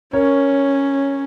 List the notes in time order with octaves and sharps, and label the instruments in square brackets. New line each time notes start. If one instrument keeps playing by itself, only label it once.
[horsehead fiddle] C#4 [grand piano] A#4 C#5